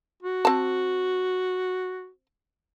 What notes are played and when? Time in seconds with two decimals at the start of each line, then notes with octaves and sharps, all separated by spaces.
0.22 F#4
0.45 C4 A5